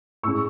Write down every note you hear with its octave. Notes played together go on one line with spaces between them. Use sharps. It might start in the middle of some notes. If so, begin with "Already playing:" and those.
A2 G#3 C#4 C#6 E6